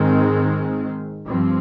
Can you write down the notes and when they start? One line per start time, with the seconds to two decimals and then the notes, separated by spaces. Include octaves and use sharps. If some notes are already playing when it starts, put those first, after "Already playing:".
Already playing: G#2 D#3 G#3 C4
1.25 G2 F3 C4